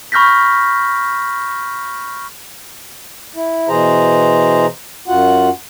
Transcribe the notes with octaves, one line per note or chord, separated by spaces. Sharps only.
B5 C#6 F6 G6 A#6 B6
E4
B2 E3 G#4 C5 A#5
F#2 F4 F#4 F#5